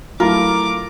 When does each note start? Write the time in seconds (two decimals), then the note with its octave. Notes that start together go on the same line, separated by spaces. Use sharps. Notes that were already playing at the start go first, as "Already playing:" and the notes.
0.20 F#3 A3 E4 F4 A#4 D6